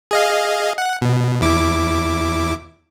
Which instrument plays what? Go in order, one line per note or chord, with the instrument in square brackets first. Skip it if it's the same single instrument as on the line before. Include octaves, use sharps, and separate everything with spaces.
[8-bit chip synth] G#4 D#5 F5
F#5
B2
E2 E4 D6